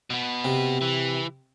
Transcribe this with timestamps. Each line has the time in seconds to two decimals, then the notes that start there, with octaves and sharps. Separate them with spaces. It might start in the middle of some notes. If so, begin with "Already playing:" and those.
0.10 B2 B3
0.45 C3
0.81 E3